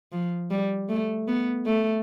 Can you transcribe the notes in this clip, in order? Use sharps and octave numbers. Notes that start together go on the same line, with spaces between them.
F3
G3
A3
B3
A3